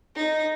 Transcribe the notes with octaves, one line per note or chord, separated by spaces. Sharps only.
D#4